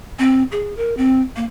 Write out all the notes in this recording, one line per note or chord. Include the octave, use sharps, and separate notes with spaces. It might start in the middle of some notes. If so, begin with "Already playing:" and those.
C4
G#4
A#4
C4
A#3